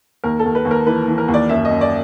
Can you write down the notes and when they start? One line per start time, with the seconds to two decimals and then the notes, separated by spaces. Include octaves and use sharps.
0.24 D#2 A#4
0.39 A4
0.45 D#2
0.55 B4
0.65 D#2
0.71 A#4
0.86 E3 B4
1.08 E3
1.18 A#4
1.28 D#2
1.34 D5
1.49 F#2 E5
1.65 D#5
1.71 F#2
1.81 D5